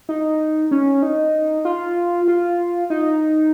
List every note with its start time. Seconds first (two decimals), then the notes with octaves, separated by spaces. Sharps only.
0.09 D#4
0.71 C#4
1.03 D#4
1.65 F4
2.28 F4
2.90 D#4